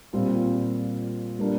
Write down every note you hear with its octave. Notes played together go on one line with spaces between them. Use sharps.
A#2 G3 C4 F4
G3 A#3 D4